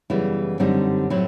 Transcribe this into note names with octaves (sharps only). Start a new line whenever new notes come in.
F#2 C#3 E3 G3 B3 E4
F#2 D3 G3 C4 D#4
A2 F#3 A3 C4 E4